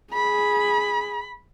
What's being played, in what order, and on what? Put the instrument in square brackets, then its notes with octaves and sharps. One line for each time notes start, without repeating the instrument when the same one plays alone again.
[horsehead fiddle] G#4 [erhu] B5